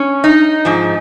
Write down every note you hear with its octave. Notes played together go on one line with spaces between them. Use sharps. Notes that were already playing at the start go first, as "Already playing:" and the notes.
Already playing: C#4
D#4
G#2 F3